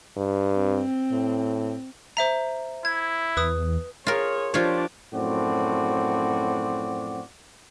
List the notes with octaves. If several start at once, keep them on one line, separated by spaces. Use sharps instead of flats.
G2
C4
A2
C5 E5 A#5
E4 G#6
E2 B4 D#6
F4 G#4 A#4 C#5
F3 D4 F4 G4 C#5 D5
F#2 A2 F3 C4 F#4 D5